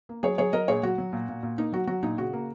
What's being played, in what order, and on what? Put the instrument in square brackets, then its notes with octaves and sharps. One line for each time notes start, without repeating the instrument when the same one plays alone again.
[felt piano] A#3
F#3 G#4 C#5
F#3 G#4 C#5
F#3 A#4 D#5
A#2 G#4 C#5
F#3 F#4
F#3
A#2
A#2
A#2
A#3 D#4
F#3 F#4
F#3 F#4
A#2 D#4
C#3 F#4
A#3